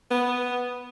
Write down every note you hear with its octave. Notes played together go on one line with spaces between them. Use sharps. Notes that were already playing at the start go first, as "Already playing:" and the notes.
B3